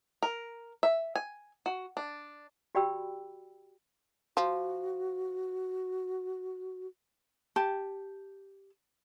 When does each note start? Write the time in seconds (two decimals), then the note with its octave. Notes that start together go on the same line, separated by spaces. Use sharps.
0.23 A#4
0.83 E5
1.16 G#5
1.66 F#4
1.97 D4
2.75 F#4 G4 D5 G5 B5 E6
4.37 F3 F#4
7.56 G4 A5